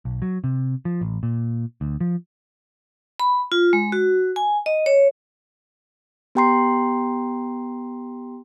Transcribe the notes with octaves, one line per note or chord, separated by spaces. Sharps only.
B1
F#3
C3
F3
A1
A#2
D2
F3
B5
F4
G#3
F#4
G#5
D#5
C#5
B3 G4 G5 A#5 C6 C7